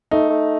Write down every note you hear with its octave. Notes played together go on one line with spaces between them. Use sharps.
A3 D#4
A3